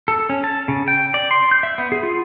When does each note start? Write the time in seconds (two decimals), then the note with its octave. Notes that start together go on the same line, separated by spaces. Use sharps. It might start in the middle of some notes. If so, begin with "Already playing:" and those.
0.08 A4
0.29 C#4
0.44 A5
0.68 C#3
0.88 G5
1.14 D5
1.31 C6
1.51 G6
1.63 E5
1.78 B3
1.92 G#4
2.03 F4